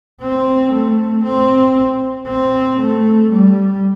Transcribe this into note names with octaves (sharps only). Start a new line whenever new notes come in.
C4
A3
C4
C4
A3
G3